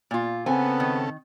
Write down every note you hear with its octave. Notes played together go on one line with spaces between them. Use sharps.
A#2 F4
C#3 B3 C4 A4 G#5
D#3